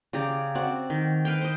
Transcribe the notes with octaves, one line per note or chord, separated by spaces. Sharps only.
C#3 G4 D5 A#5
C4 F#4 D5 F#5
D#3
B4 F5 G5
C5 D#5